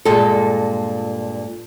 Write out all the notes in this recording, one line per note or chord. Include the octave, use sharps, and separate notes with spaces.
G2 A#2 G#3 A4